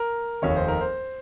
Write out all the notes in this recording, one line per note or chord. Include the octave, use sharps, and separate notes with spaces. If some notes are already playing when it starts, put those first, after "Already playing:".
Already playing: A#4
F1 D#2 D#3 C#5
C5
A#4
C5